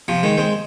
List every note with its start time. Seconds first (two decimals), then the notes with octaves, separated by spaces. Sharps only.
0.08 C3 F3
0.23 D#3 G#3
0.38 G#3 C4